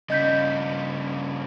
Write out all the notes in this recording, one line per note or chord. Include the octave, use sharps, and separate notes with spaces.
G2 C#3 D#5 G6 B6